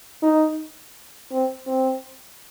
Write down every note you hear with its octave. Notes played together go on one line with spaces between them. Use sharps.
D#4
C4
C4